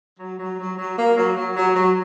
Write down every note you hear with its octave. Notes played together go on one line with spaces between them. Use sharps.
F#3
F#3
F#3
F#3
A#3
F#3
F#3
F#3
F#3